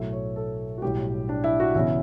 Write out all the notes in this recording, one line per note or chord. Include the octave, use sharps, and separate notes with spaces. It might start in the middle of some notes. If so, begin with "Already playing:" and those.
Already playing: B1 A2 F#3 A3 E5
C#5
A4
F#4
B1 A2 G3 G4
D4
E4
F#4
E1 E2 C#3 E4